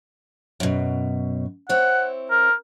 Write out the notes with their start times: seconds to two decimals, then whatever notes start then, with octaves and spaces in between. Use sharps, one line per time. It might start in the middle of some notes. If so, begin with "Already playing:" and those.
0.60 F#2 B2
1.69 C4 E4 C#5 F#5
2.31 A#4